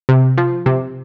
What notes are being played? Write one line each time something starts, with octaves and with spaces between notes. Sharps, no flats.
C3
F3
C3